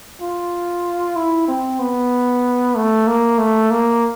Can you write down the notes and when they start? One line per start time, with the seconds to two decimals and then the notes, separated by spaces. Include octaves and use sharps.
0.21 F4
1.16 E4
1.48 C4
1.80 B3
2.75 A3
3.07 A#3
3.38 A3
3.71 A#3